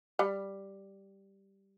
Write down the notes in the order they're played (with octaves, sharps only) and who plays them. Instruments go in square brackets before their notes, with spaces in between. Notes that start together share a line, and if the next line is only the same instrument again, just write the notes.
[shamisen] G3